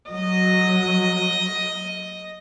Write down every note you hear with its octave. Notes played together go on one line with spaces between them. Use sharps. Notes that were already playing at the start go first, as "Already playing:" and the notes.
F#3 D#5